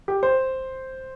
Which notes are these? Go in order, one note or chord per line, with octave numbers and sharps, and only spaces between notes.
G4
C5